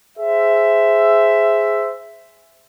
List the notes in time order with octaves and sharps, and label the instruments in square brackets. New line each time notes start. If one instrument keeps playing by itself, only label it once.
[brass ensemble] G#4 C5 E5